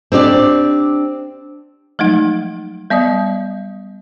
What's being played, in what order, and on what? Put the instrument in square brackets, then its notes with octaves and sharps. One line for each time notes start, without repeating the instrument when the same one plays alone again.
[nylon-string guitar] C4 D4 G4 D5
[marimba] F3 F#3 G#3 A3 D#4
G3 B3 D5 D#5 D#6